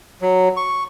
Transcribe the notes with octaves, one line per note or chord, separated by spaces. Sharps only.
F#3
C#6